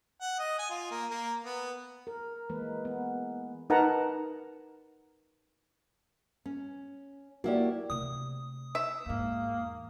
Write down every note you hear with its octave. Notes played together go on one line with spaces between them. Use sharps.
F#5
D#5
G#5
F4
A#3
A#3
B3
A#4
E3 G#3 A#3 B4
B3
D#4 A#4 B4 F#5 A5 A#5
C#4
A#3 E4 F#4 G4 D5
C3 A3 D#6
E5
E2 G#2 A#3